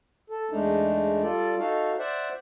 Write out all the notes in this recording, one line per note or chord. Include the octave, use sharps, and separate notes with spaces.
A4
E2 G#3 A3 D4 D#4
G3 F4 A4 D5
D#4 F#4 A4 F5
C5 D5 E5 F#5